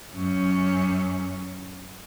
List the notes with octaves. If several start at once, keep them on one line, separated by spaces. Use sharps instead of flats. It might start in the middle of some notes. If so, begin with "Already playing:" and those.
F#2 C#4